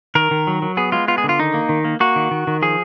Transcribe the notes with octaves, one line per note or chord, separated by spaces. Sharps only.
D#3 A#4
D#3
F#3
F#3
B3 G#4
G#3 F4
B3 F4
G#4
D3
F4
D#3 D#4
A#3
D#3
A#3
A#3 F#4
D#3
D#3
D#3
F3 G#4